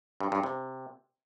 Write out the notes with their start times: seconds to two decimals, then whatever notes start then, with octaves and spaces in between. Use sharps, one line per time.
0.20 G2
0.32 G2
0.43 C3